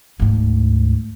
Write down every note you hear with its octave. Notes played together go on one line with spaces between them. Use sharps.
D2 G#2